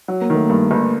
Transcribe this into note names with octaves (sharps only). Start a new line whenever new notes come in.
F#3
A#3
D#3
A3
G2 A#3
G1